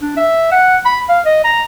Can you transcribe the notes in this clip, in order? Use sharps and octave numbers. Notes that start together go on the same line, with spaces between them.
D4
E5
F#5
B5
F5
D#5
A#5